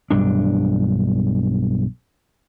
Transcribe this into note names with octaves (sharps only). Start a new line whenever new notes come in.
B1 G2 D4